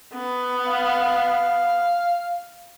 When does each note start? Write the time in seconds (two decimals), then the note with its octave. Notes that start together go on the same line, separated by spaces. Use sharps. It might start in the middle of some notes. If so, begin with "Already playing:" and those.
0.14 B3
0.67 F5